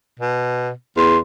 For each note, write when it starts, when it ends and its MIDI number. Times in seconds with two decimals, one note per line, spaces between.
0.20 0.71 47
0.97 1.17 40
0.97 1.17 84